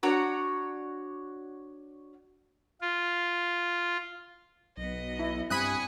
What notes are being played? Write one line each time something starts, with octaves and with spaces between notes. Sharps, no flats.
D4 F#4 C#5 A#5
F4
B1 B3 D#5
E4
G2 G3 C4 G#5 B5 C#6 D#6 F#6